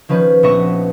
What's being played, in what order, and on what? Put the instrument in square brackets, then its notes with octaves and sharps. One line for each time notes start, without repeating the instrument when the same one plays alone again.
[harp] D#3 F3 C#4 B4
A#1 B3 F#4 E5 C#6 A#6